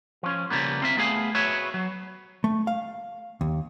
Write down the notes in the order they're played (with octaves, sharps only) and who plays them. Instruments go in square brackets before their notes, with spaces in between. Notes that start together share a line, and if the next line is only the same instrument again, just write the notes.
[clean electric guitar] F3 C#4
C#3 F3 G3 A#3 B3
C4 F4 E5
A3 B3 G#4 F5 G#5
F#4 G#4 B4 C#5 E5
F#3
[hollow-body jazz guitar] A3
F5
D#2